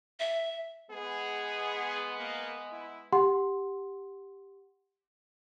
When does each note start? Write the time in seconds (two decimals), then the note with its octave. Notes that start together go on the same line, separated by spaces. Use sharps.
0.20 E5
0.91 G#3 B3 G#4
2.18 A#3
2.72 E4
3.12 G4 F#5 C6